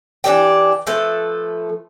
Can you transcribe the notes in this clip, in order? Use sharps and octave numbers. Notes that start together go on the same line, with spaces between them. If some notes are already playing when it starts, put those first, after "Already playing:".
E3 D4 G4 G5
F3 A3 A4 B4